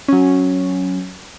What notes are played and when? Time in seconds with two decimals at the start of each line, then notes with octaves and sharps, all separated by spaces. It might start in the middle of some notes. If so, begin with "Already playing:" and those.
0.08 F#3 C#4